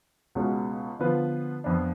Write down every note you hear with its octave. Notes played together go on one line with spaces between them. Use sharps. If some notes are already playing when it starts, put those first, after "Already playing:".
C#2 B2 G#3 C#4 F#4
D3 F3 B3 F4 B4
F2 F3 B3 D4